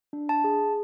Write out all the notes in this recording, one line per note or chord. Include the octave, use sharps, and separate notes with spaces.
D4
A5
G#4